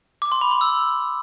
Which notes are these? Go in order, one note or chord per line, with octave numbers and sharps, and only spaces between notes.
D6
C6
B5
C6
E6